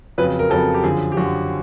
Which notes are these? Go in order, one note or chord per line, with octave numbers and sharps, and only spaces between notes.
F2 C#3 F#3 B4
A#4
F2 C#3 F#3 A4
G4
F#2 D3 F3 G#4
G4
F#2 D3 F3 F#4